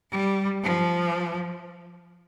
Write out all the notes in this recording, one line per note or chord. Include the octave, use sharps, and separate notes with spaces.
G3
F3